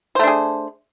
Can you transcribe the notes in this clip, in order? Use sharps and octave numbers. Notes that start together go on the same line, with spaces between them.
A3 D4 G#4 C5